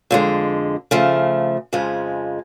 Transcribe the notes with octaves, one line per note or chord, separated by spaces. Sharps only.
F2 D3 G#3
C#3 F3 A3
F2 C#3 F3 G#3